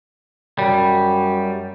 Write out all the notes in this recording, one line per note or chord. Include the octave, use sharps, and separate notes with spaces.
F#2 G3